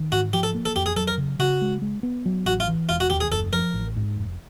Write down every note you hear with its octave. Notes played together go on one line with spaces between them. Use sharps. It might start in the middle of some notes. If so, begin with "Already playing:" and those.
Already playing: D#3
G#2 F#4
F3 G4
A4
A#3
A4
F2 G4
G#4
F#3 A4
A#4
C#3
C#3 F#4
G#3
G#3
B3
F#3
A1 F#4
F4
E3
E1 F4
F#4
D#2 G4
G#4
F#1 A4
F3 A#4
A1
G#2
F1